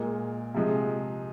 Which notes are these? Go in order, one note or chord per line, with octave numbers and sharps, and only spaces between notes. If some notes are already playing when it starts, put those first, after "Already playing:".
Already playing: A#2 G#3 A#4
C3 F3 G#3